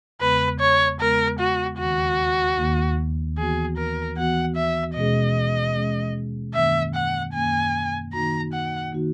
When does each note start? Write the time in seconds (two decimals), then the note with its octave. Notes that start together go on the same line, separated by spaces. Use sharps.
0.20 E2 C#3 G#3 B3 B4
0.60 C#5
1.00 E2 C#3 G#3 B3 A#4
1.39 F#4
1.78 D#2 D#3 A#3 F#4
2.58 D#2 D#3 A#3
3.37 E3 B3 F#4 G#4
3.77 A#4
4.16 E3 B3 F#4 F#5
4.56 E5
4.96 B2 G#3 C#4 G#4 D#5
5.75 B2 G#3 C#4 G#4
6.54 F#2 D#3 A#3 C#4 E5
6.95 F#5
7.34 F#2 D#3 A#3 C#4 G#5
8.13 D#3 A#3 D#4 F#4 A#5
8.53 F#5
8.92 D#3 A#3 D#4 F#4